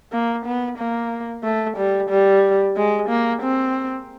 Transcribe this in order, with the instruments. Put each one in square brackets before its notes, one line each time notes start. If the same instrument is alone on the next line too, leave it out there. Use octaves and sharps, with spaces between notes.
[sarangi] A#3
B3
A#3
A3
G3
G3
G#3
A#3
C4